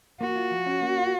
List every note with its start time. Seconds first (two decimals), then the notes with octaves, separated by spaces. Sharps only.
0.21 A#3 F#4
0.36 F4
0.51 F3
0.66 C#4
0.81 A#3
0.97 F4